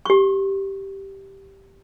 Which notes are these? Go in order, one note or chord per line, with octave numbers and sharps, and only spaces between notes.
G4 C#6